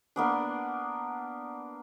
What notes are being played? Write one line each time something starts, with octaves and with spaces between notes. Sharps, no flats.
A#3 B3 D4